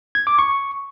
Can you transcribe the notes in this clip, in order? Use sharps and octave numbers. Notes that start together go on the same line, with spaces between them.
G#6
D6
C#6